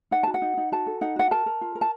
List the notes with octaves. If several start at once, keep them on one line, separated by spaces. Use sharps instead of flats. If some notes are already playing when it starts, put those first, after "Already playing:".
D#4 F#5
F#4 A5
F#5
D#4
D#4
F#4 A5
A4
D#4 F#5
F#4 F#5
A#4 A5
A#4
F4
A#4
A5